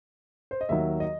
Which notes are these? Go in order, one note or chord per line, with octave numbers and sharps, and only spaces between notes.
C5
D#5
D#2 D#3 F#3 E5
D#5